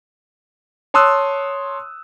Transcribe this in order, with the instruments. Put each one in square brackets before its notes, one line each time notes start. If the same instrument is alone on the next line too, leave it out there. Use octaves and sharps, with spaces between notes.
[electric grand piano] C#5 A5 C6 D#6 E6 F#6